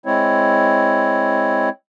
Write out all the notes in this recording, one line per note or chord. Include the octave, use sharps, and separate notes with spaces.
G#3 C4 E4 C#5